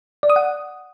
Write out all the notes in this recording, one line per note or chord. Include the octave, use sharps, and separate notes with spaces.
D5
D#6
F#5